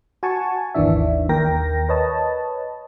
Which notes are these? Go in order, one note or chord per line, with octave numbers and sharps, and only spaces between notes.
F#4 G#5 A5 C#6
G#1 D#2 D#3 E3 D4 E5
D#2 A#4 G5 A#6
B4 C#5 D#5 A5